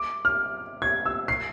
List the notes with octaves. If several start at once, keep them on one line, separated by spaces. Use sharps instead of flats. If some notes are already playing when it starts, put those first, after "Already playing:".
Already playing: D6
F6
G#6
E6
C7